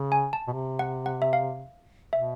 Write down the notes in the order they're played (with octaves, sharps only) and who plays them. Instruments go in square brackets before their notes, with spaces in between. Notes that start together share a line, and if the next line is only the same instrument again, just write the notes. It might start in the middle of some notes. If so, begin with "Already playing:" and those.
Already playing: [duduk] C#3
[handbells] G#5
A5
[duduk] B2
C3
[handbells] F#5
F#5
E5
F5
[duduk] B2 [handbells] E5